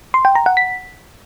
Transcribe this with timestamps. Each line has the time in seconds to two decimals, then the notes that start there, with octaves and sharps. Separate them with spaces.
0.14 C6
0.25 G5
0.35 A#5
0.46 F#5
0.57 B6